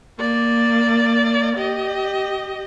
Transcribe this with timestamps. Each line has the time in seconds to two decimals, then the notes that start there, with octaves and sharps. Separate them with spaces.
0.20 A#3 D5
1.56 G4 D#5